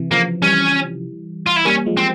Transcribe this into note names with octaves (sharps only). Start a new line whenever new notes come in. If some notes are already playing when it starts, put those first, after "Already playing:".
Already playing: C3 E3
C#3 F3 A#3
E3 G3 C#4
F4
E4
G3 A#3 C#4
F3 G#3
C4